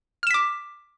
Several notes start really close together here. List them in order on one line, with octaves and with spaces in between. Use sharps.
F6 E7 B6 D6